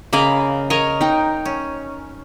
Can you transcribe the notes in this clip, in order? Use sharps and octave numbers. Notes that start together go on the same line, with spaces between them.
C#3 A#3 A#4 D#5 B5
A#4 C#5 D#5 C#6
D#4 G5
C#4